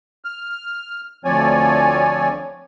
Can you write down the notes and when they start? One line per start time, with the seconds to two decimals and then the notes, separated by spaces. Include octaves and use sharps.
0.25 F6
1.25 D2 F3 C4 C#5 D5 G#5